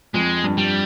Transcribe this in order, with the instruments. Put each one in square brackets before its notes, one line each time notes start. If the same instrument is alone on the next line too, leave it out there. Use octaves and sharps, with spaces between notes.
[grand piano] F2 [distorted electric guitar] G#3
[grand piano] G2
[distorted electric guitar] G3